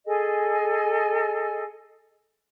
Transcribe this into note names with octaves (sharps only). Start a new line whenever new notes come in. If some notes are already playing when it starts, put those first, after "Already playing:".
G#4 A4 D#5 G#5